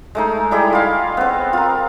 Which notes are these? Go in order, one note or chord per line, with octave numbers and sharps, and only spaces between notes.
G#3 A3 D#4
G3 E4 G#4 D#5
F4 F5
B3 C4
F4 A#4